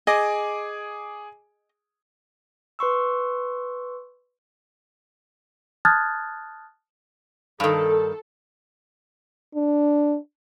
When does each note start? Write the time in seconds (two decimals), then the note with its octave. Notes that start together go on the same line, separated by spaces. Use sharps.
0.07 G#4 D#5 G#5 D6
2.79 B4 C6 C#6 E6
5.85 A5 D#6 F6 F#6 G#6 A6
7.60 G2 D#3 A4
9.55 D4